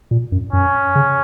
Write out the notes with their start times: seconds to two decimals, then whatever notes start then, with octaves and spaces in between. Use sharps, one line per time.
0.11 A#2
0.32 F#2
0.53 F#2 C#4
0.95 C#3